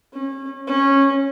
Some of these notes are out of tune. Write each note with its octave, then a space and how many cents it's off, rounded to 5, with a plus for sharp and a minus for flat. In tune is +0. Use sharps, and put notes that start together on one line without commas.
C#4 -30
C#4 -15